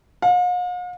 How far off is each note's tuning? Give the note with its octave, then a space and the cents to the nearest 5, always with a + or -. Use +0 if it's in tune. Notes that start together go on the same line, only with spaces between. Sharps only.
F5 +45